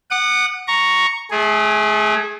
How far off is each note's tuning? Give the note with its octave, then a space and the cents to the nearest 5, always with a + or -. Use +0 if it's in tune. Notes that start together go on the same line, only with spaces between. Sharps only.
F#5 +0 D#6 -40
A#5 +0 C#6 +0
A3 -30 G#4 +0